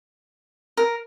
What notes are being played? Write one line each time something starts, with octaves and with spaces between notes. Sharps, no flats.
A#4